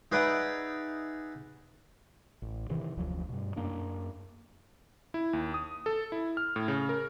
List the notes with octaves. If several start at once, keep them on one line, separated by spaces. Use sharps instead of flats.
D#4 G#4 B4 D5 E5 F#5
A1
C3 D#3 E3
F1 D2 F3 F#3
G2 B2
F#2 A#3 D4
E4
D#2
D#6
A4
E4
F6
A2
C#3
A#4